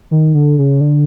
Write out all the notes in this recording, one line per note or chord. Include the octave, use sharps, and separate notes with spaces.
D#3
D3
C#3
D3